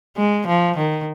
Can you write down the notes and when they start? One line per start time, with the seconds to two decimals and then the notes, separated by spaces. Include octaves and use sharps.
0.17 G#3
0.48 F3
0.77 D#3